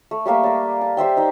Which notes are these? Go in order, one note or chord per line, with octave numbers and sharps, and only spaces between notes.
A3
G3 A3 A#3 E5
A#4 D5
A5
G4 C5 E5 G5
D#4 C5 E5